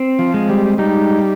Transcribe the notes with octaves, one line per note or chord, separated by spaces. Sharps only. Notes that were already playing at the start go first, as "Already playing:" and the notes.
Already playing: C4
F3
G#3
G3
G3 D#4